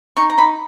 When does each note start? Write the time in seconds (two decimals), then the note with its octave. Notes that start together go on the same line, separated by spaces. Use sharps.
0.17 D#4 C#6
0.30 A#5
0.38 D#4 B5